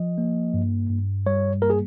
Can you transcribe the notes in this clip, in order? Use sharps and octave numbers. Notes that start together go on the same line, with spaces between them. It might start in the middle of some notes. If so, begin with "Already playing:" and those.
Already playing: F3 D#5
A#3
G2
G2
G3 C#5
A#3 A#4
G#4